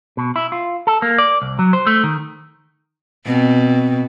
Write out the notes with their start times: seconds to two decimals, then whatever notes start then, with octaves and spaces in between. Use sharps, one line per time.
0.17 B2
0.36 E4
0.52 F4
0.87 A4
1.02 A#3
1.18 D5
1.42 C2
1.59 F#3
1.73 C5
1.87 A3
2.04 D#3
3.26 B2 C4